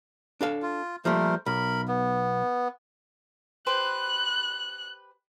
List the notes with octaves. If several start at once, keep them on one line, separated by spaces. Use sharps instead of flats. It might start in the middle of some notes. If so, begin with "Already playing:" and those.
D4 A4 F5
F4
F3 G3 A3 A#3 A#4 C5
B1 A#4 B5
B3
G4 B4 C5 F#6